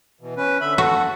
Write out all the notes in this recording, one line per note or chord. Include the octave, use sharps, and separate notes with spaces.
B2 E3
C#4 B4
D3 E5 B5
F#4 A4 F#5